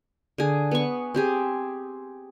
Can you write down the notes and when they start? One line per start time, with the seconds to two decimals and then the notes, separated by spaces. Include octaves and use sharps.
0.38 D3 G#4
0.71 B3 C#6
1.15 C4 G4 G#4